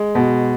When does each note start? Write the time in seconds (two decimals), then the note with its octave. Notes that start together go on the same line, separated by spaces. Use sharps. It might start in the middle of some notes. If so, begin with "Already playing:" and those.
Already playing: G#3
0.15 B2